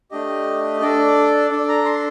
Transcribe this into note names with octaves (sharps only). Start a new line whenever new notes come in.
A3 D4 G4 D#5
D4 A4 D5
D4 A4 D5
A#5
C6